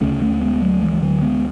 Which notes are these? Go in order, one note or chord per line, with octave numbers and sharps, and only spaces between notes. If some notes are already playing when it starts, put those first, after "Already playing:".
D2 C#3 A3 C#4
A3 C#4
G#3 B3
F#3 A3
E3 G#3
E3
D3 F#3
G#3 B3